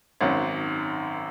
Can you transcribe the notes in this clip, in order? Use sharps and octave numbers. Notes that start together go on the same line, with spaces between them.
G#1 F#2 D#3